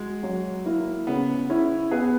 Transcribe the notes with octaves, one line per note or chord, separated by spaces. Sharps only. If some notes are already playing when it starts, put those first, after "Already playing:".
Already playing: G#3 F#4
F#3
A#3 E4
C#3 B3
C#4 E4
B3 G#4